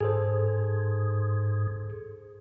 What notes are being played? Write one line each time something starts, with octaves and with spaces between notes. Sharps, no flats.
G#2 G#4 A4 C5